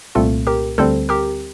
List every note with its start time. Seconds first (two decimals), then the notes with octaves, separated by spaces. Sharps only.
0.15 C2 A#2 A3 C4 F4 A4
0.47 G4 A#4
0.78 D2 D3 G3 C4 A4 C5
1.09 G4 A#4